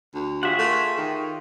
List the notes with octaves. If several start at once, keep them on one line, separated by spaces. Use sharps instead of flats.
D2
F4 G4 G#4 C#5 E5 F#5
A3 A#4 C#6
D#3